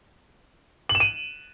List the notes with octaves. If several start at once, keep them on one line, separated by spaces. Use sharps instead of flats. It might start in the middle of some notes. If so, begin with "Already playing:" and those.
F#7
E7
D#7